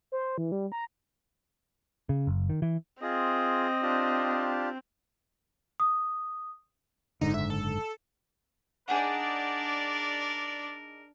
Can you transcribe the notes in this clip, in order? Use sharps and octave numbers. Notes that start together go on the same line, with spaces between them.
C5
E3
G3
A#5
C#3
F#1
D#3
E3
C4 F4 G#4 D#5
D4 F4 G4
D#6
F#1 G#2 D3 D#4
E5
A4
D4 D#4 G#4 A#4 D5 F#5